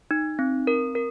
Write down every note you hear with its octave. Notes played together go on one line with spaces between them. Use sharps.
D#4
C4
A#4
A#4